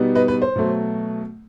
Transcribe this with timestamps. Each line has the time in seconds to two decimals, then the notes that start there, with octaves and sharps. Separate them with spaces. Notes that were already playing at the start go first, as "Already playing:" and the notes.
Already playing: B2 G3 B3 D#4
0.15 B4 D#5
0.28 B4
0.42 C5
0.56 B2 F#3 A3